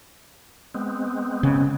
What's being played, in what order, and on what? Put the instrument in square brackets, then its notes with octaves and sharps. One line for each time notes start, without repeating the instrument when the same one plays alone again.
[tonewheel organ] G#3 B3 C4
[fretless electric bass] C#3